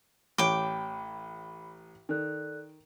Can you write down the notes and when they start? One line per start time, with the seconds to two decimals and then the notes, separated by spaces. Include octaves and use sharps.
0.38 A1 C#5 G5 B5 D6
2.09 D#3 A4 D5 F#6